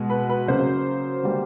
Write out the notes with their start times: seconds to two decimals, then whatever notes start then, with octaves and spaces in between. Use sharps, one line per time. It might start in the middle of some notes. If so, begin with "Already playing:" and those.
Already playing: B2 G#3
0.10 B4
0.29 B4
0.48 C#3 F#3 A#3 C5
1.23 D3 G3 A#3